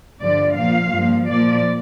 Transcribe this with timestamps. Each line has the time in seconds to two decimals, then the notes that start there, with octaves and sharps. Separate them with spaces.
0.21 G2 D3 F3 D5
0.57 A#2 F3 A#3 F5
0.93 G2 F3 A#3
1.28 A#2 F3 A#3 D5